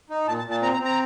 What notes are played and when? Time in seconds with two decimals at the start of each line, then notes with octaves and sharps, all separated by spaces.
0.10 D#4
0.27 A#2 A5
0.38 A5
0.45 A#2
0.51 A5
0.62 C4 A#5
0.74 A#5
0.79 C4
0.85 A#5